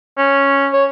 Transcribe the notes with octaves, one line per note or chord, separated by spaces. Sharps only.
C#4
C#5